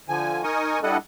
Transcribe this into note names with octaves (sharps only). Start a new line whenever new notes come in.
D3 F3 G#5
D#4 A#4 D#5 G#5 C#6 D#6
G3 D4 E4 A4 D#5 F#5